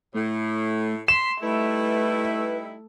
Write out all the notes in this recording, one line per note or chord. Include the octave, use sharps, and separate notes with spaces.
A2 A3
C6 B6 E7
G3 A3 D#4 E4 B4